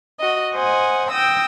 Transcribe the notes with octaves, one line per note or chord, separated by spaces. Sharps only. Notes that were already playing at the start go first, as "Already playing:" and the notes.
F#4 D#5
C5 D#5 F#5 G#5
G5 D#6 E6 A#6